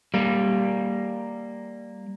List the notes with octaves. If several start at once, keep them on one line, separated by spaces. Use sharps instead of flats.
G3 A#3